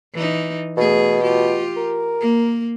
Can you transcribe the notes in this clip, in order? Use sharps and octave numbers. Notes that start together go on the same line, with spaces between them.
E3 D#4
B2 A3 G#4
F4 G4
A#4
A#3